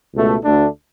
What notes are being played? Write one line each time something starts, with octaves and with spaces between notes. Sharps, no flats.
C#2 B2 A3
D2 D3 A3 D4